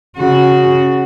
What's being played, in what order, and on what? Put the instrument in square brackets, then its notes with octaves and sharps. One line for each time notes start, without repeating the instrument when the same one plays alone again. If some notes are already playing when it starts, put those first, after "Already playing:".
[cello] C#3 F#4